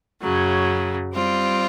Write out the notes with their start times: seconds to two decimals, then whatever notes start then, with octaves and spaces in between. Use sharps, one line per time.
0.20 F#2 C#3 F#3
1.13 G3 C4 F4